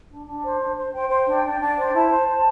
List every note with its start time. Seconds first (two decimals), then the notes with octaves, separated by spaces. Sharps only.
0.09 D4
0.26 D4
0.43 C5
0.59 D4
0.77 C5
0.93 C5 G5
1.10 C5
1.27 D4
1.44 D4
1.60 D4
1.78 C5
1.83 G5
1.94 E4 A5
2.10 C5
2.27 C5